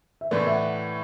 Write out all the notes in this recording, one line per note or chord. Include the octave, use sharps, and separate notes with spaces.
E5
A2 E3 A3 D5
E5
F#5